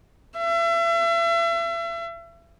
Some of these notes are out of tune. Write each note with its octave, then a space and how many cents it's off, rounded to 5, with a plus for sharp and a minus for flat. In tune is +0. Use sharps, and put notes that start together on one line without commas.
E5 +35